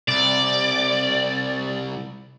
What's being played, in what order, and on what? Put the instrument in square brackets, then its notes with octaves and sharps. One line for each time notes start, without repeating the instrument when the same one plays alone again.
[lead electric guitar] C2 [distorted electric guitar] D5